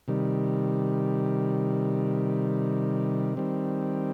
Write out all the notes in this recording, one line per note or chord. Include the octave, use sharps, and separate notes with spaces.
C3 D#3 G3
D#3 G3 C4